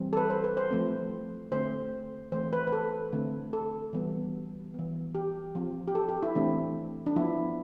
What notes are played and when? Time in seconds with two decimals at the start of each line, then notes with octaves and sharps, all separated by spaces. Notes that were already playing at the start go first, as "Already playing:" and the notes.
Already playing: E3 G3 C4
0.13 A4
0.17 B4
0.30 C5
0.44 B4
0.57 C5
0.71 F3 A3 C4
1.51 D3 A3 C4 C5
2.32 E3 A3 C4 C5
2.53 B4
2.67 B4
2.73 A4
3.12 D3 A3 C4
3.53 A4
3.93 E3 G3 B3
4.74 E3 B3
5.15 G4
5.55 F3 C4
5.88 G4
5.95 A4
6.09 G4
6.23 E4
6.35 E3 A3 C4 D4
7.06 D4
7.16 F3 B3 E4